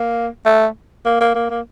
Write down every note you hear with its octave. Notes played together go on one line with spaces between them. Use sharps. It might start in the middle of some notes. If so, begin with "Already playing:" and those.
Already playing: A#3
A3
A#3
A#3
A#3
A#3